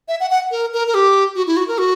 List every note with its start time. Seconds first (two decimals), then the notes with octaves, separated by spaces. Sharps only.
0.08 E5
0.20 F#5
0.30 F#5
0.51 A#4
0.73 A#4
0.87 A#4
0.94 G4
1.35 F#4
1.47 E4
1.57 F#4
1.68 A#4
1.78 F#4